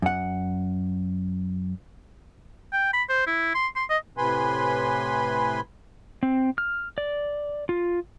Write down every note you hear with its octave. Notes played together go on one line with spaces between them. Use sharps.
F#2 F#5
G5
B5
C5
E4
C6
C6
D#5
A2 C3 B4 G#5 B5 C6
C4
F6
D5
F4